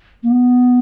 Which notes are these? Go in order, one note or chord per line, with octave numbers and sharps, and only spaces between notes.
A#3
B3